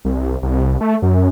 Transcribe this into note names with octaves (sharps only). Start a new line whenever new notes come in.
C2
C2
A3
F#2